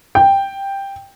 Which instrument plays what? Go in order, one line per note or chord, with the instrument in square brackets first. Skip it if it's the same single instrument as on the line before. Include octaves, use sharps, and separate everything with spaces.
[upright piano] G5